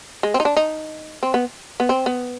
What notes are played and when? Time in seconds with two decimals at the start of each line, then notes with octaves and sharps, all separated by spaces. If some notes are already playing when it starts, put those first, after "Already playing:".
0.23 G#3
0.34 C4
0.40 D#4
0.45 D4
0.57 D#4
1.23 C4
1.34 B3
1.80 B3
1.89 C4
2.06 B3